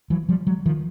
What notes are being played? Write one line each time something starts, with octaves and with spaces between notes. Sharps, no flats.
E3 F#3
F3 G3
F#3 G#3
D#3 F3